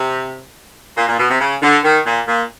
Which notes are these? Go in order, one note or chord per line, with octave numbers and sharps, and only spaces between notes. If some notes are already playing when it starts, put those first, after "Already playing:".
Already playing: C3
A#2
A#2
B2
C3
C#3
D3
D#3
A#2
A#2